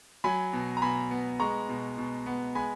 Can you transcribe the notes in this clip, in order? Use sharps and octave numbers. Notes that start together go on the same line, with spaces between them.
F#3 G#5 B5
B2
A#5
B2 G#5 B5
B3
G#3 A#5 C#6
B2
B2
B3
G#3 G#5 B5